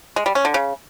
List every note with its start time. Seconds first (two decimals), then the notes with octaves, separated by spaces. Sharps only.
0.16 G#3
0.26 G3
0.35 C#4
0.45 D3
0.54 C#3